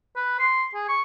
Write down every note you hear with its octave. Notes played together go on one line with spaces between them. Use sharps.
B4
C6
G#4
C#6